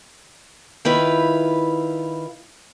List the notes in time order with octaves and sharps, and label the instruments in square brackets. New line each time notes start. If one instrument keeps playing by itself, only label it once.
[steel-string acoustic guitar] D#3 E4 F4 B4